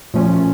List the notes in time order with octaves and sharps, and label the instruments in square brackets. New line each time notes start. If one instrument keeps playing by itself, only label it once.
[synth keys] A#2 F3 A3 C#4 F4